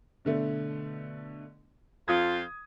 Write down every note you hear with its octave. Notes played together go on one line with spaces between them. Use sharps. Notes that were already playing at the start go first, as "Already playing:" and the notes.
B2 D3 A3
F2 F4 D#6 G#6